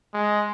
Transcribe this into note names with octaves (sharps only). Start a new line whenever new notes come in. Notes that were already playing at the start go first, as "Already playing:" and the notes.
G#3